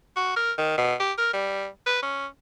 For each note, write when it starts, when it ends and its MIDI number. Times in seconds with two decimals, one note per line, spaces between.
0.16 0.36 66
0.36 0.52 70
0.58 0.76 51
0.77 0.94 47
1.00 1.12 67
1.18 1.29 70
1.33 1.67 55
1.86 2.00 71
2.02 2.26 61